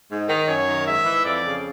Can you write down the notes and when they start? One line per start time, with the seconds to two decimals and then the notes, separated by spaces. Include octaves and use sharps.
0.10 G#2
0.29 D#3
0.48 F#2 C#5
0.68 D#3
0.87 G#2 E5
1.05 E3
1.24 F2 D5
1.44 C#3